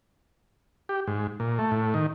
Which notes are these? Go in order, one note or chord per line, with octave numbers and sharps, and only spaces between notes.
G4
G#2
A#2
A3
A2
D#3